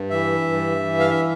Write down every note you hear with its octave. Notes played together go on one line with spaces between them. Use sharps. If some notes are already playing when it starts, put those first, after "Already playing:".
Already playing: G2
E3 E5
G2
E3
F5
E5